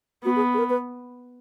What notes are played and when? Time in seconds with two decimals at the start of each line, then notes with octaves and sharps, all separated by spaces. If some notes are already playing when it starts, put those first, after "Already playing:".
0.24 B3 F#4
0.36 G#4
0.54 G#4
0.58 A#4
0.70 B4